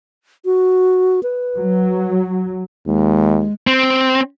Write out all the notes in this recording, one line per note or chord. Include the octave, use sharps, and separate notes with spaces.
F#4
B4
F#3
D#2 G#3
C4